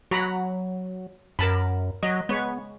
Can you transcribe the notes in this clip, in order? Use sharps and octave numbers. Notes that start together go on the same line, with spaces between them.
F#3 F#4 A#5 B5
F#2 A#4 A5 B5
F#3 D#5
G#3 B3 C#5